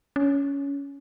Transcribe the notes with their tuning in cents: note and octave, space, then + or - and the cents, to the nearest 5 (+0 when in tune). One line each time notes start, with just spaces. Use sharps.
C#4 +15